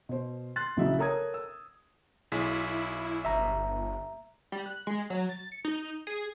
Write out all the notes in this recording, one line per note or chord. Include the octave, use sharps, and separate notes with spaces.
B2 C5
C6 F#6 A6
A#1 C#3 F#3 E4 D#5 E5
A4 A#4 C#5 A#5 D#6 G#6
E6
B1 E4 G#4 B6
G1 E5 A#5
G3
F#6
G#3
F#3
A6
C#7
D#4
G#4